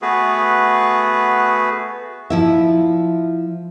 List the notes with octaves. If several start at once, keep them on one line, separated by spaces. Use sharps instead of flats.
A3 B3 F#4 G#4 B4
F3 E4 E5